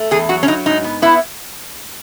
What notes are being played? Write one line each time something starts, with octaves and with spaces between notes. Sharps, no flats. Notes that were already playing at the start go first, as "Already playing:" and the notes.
Already playing: A3
E2 G#4
F#3 F#4
C#4
F#3 D#4
G#2 D#4
B3
B3 E4